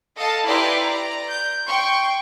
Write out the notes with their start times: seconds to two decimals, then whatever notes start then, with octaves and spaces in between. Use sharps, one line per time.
0.16 A4 D#5 F5 A5
0.45 E4 G4 B4 D5 A#5 C6
0.79 D5 A#5
1.28 G6
1.67 G5 C6 C#6